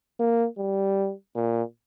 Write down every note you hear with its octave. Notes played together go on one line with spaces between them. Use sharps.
A#3
G3
A#2